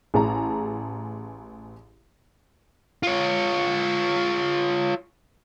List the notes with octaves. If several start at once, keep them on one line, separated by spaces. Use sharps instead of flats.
A1 G#4 A5 A#5
F4 C#5